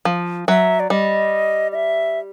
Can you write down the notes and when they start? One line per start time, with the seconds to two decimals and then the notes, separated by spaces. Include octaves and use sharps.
0.05 F3
0.48 F#3 E5
0.80 D5
0.90 G3 D#5
1.72 D#5
1.75 E5